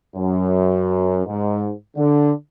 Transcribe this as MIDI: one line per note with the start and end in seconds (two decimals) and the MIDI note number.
0.16 1.22 42
1.27 1.71 44
1.97 2.33 50